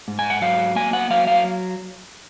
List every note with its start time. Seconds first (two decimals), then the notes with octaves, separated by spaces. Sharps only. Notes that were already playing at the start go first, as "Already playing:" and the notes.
0.08 G#2
0.19 G#5
0.30 F#5
0.41 F#3 F5
0.76 A#3 G#5
0.93 F#5
1.10 F#3 F5
1.27 F5